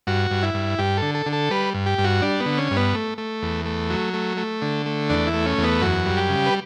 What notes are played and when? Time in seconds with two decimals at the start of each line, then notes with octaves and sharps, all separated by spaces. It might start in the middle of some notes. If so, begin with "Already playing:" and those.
0.07 G2 F#4
0.31 G2
0.43 E4
0.54 G2
0.78 G2 G4
0.97 D3 A4
1.15 A4
1.26 D3
1.33 A4
1.50 G3 B4
1.74 G2
1.86 G4
1.98 G2
2.04 F#4
2.22 G3 D4
2.40 B3
2.46 D3
2.58 C#4
2.71 G2
2.77 B3
2.94 A3
3.18 A3
3.43 E2
3.65 A3
3.90 F#3
4.14 A3
4.37 A3
4.62 D3
4.86 A3
5.10 E2 D4
5.27 E4
5.34 A3
5.46 C#4
5.58 E2
5.64 B3
5.81 F#2 F#4
6.06 G3
6.17 G4
6.29 C#3
6.46 B4